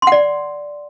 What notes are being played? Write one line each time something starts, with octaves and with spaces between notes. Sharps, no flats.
D5 F#5 C6